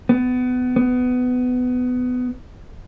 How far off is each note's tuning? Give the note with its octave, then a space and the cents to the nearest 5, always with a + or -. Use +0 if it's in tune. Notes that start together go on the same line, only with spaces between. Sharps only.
B3 +25
B3 +20